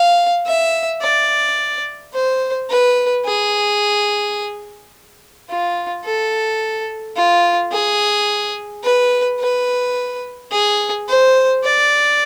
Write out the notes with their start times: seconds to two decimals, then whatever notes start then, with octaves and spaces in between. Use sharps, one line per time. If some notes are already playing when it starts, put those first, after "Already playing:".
Already playing: F5
0.46 E5
1.02 D5
2.13 C5
2.70 B4
3.25 G#4
5.50 F4
6.05 A4
7.16 F4
7.73 G#4
8.84 B4
9.40 B4
10.52 G#4
11.08 C5
11.64 D5